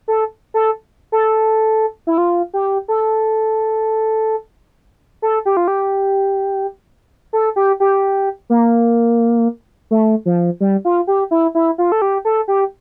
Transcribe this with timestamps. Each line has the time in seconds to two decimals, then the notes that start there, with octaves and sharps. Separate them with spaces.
0.08 A4
0.54 A4
1.12 A4
2.07 E4
2.18 F4
2.54 G4
2.88 A4
5.22 A4
5.45 G4
5.57 F4
5.68 G4
7.33 A4
7.56 G4
7.80 G4
8.50 A#3
9.91 A3
10.26 F3
10.60 G3
10.85 F4
11.07 G4
11.31 E4
11.55 E4
11.78 F4
11.92 A4
12.02 G4
12.25 A4
12.48 G4